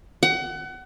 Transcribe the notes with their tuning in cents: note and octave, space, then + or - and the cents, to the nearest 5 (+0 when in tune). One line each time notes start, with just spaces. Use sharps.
F#5 +30